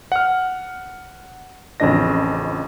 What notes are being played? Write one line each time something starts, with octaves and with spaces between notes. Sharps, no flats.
F#5 F6
A1 F2 C#3 D4 D#5 A#6